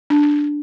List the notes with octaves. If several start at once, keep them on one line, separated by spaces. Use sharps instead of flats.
D4